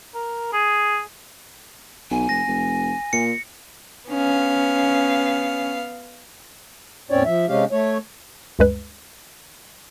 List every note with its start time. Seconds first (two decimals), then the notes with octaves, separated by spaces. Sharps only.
0.15 A#4
0.53 G#4
2.11 B1 G#5
2.29 F1 A#6
2.47 F1
3.13 A#2 C#7
4.10 B3 C#4 F5
7.11 E2 A2 C4 C#4 C#5 D5
7.25 F3 E5
7.48 C3 G#3 C#4 G4 F5
7.72 A3 C#5
8.59 D2 G2 G#3 B4